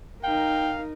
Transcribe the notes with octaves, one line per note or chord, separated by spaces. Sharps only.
D#4 A#4 F5 G5